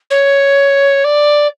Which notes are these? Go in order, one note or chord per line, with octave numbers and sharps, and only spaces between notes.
C#5
D5